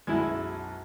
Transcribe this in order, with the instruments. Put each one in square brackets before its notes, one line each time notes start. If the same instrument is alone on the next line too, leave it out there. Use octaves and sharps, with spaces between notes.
[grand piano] B1 F#2 G#6 [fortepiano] G#3 E4